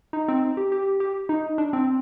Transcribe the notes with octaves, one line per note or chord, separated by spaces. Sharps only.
D#4
C4
G4
G4
G4
D#4
D4
C4